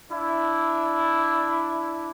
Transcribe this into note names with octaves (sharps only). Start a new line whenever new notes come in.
D4 E4